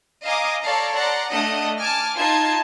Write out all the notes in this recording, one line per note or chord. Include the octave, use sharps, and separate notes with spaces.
D#5 F5 G#5 A#5 D6 D#6
A4 C#5 D5 F5 A5 A#5
D5 F#5 A#5 C6
A3 D4 D#5 F#5 D#6
G#5 A5 D6 F6
D#4 F4 A5 G#6